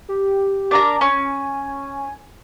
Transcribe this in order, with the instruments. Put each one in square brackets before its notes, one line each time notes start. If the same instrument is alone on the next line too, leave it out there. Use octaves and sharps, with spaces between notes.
[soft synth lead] G4
[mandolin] D4 A#4 A#5
[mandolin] C#4 [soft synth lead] G#5